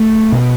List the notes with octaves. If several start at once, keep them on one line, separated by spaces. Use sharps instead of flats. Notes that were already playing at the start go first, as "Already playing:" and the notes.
Already playing: A3
B2